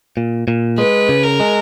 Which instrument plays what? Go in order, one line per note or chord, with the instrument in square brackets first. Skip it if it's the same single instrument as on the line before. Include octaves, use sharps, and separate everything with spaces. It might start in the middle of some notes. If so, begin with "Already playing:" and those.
[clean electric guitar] A#2
A#2
[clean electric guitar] G#3 [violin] B4
[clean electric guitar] C#3
[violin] A#4
[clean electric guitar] G#3